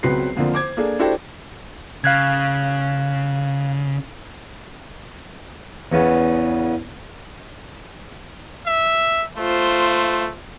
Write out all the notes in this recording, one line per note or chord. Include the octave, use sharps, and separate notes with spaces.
C#2 F#3 B3 C4 B4 C7
F2 D3 F3 A#3
C5 D6 G#6
A#3 D4 G#4 A4
D4 E4 F#4 G4 A4 C5
C#3 F5 F#6 G#6
E2 C#3 B3
E5
A3 F4 C5